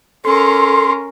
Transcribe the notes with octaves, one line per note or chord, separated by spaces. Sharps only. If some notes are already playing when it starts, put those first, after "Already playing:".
C#4 A4 A#4 C6